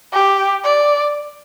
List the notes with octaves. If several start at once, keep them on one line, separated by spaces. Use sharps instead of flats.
G4
D5